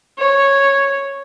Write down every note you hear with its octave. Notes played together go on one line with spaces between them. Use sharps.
C#5